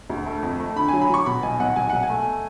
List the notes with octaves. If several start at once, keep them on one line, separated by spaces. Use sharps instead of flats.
D2
A3
F2
A3
D3 B5
F#3 G#5
B5
F#3 C#6
B2 B5
B1 G#5
B1 F#5
B1 G#5
B1 F#5
G#5
A3